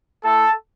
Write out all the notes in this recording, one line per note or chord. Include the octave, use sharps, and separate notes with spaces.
A3 E4 A4